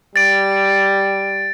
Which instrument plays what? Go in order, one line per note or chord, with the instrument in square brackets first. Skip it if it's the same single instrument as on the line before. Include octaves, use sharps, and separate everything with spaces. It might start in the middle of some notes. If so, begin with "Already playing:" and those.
[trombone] G3 [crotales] A6 D7